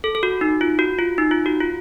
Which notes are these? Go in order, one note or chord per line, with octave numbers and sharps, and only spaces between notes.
A4
A4
F#4
D#4
F4
F#4
F4
D#4
F4
F#4
F4